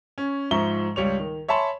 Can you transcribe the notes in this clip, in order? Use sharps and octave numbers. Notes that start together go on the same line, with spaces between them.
C#4
G#2 F3 E5 A#5 C#6 G7
C#2 G3 C#5 F7
D#3
C#5 E5 G#5 A5 B5 C6